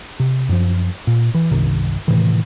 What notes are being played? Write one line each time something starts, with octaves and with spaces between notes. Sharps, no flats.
C3
F#2 F3
A#2
E3
G1 C2 C3 D#3
A2 C3 D#3 E3